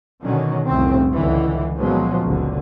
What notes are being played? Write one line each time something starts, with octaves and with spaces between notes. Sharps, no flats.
B2 D3 D#3 F#3 C#4
F1 C2 A2 C#3 C4
C#2 D3 E3
A#2 C#3 F3 F#3 G#3 B3
F#1 C#2 D3